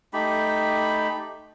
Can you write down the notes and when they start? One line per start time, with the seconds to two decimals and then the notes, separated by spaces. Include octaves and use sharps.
0.13 A3 D#4 G4 B5